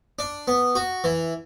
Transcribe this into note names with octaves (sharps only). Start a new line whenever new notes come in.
D4
B3
F#4
E3